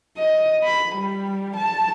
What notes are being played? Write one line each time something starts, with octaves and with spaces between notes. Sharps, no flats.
D#5
B5
G3
A5